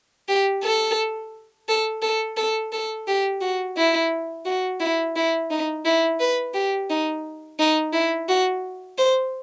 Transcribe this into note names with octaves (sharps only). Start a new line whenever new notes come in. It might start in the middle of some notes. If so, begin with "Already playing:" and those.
G4
A4
A4
A4
A4
A4
G4
F#4
E4
F#4
E4
E4
D#4
E4
B4
G4
D#4
D#4
E4
F#4
C5